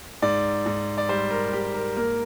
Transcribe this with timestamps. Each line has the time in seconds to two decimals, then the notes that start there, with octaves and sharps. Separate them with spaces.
0.22 G#2 D5
0.66 G#2
0.98 D5
1.09 G3 C5
1.31 A#4
1.53 G#2 G4
1.74 A#4
1.96 A#3 A#4